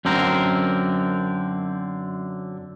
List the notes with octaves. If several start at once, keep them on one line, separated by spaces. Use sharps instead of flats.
F#2 D3 C4 A#4